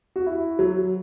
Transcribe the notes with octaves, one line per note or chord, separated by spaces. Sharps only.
F#4
E4
F#3